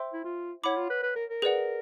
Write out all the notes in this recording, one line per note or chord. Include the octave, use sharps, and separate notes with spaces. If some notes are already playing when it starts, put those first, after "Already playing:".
Already playing: C5 E5 G5 C6 E6
E4
F4
E4 C#5 F#5 B5 D6
F4
B4
B4
A#4
A#4
G#4 B4 D5 F#5